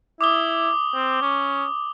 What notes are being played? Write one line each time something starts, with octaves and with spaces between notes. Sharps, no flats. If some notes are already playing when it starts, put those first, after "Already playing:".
E4 D6 D#6 G7
C4
C#4